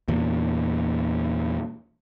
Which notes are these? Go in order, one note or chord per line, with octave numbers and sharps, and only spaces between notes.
E2 A#2